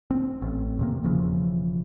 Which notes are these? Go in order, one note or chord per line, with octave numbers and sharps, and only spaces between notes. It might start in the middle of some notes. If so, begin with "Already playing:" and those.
C4
A1
E2 C3 A#3
E1 C#3 E3 F3